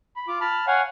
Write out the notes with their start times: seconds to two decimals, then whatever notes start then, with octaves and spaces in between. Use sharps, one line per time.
0.16 B5
0.28 F4 D6
0.41 A5 B5 F6
0.67 C#5 F5 F#5 G#5